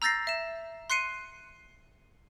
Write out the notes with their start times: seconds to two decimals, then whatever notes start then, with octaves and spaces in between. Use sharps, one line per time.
0.02 A#5 E6 G6 A6 A#6 C7
0.27 E5 E7
0.90 C6 F#6 C7 C#7 D#7